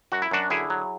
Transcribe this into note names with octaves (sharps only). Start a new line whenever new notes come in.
F#2 F#4
E4
F#2 D4 F#4
D3 E4 G#4
F#3